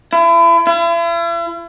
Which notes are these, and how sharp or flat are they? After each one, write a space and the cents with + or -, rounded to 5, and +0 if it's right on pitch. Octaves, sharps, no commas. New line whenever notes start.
E4 +35
E4 +45